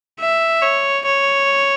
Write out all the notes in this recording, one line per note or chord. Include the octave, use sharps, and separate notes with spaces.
E5
C#5
C#5